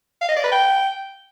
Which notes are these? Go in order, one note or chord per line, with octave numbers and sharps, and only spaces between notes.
F5
D#5
D5
B4
G5